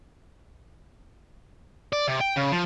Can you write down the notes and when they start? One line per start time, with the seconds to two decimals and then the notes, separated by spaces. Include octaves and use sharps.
1.93 D5
2.07 C3
2.20 G5
2.36 C#3
2.52 F3